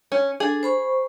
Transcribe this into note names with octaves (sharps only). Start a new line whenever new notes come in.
C#4
D4 G#4 A4
C5 B5 C#6